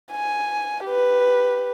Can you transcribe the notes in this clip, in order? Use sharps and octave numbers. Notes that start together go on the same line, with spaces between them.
G#5
G4 B4